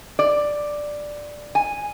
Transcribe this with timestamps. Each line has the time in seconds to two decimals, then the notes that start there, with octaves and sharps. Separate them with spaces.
0.19 D5
1.55 G#5